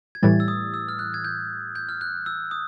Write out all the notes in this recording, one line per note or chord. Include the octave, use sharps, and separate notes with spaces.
G#6
A2 E3 G3 A6
E6
D#6
E6
F6
F#6
G#6
G6
G6
F6
F#6
E6
D#6